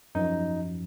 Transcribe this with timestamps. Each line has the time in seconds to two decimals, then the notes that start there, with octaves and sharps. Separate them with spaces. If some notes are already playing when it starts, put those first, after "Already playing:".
0.15 F#2 F3 D#4